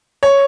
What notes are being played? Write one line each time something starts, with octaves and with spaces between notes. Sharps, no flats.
C#5